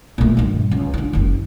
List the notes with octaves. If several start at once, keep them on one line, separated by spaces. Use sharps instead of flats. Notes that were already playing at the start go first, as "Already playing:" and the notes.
A#2 A3
G2 D#3
C#2
D3 D#3
F#1 D#2